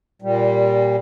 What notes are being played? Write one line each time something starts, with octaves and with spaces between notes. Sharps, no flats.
A#2 G3